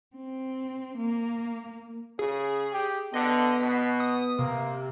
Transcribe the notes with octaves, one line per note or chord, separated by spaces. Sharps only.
C4
A#3
C#3 G#4
G4
D3 B3 D#5
B2 B6
D#6
C3 A#3